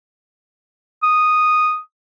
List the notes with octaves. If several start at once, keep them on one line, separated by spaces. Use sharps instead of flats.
D#6